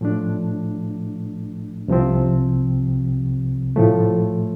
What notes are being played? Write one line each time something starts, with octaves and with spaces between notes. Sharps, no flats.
A2 F3 A3 D4
C2 C3 F3 C4
A2 F3 A3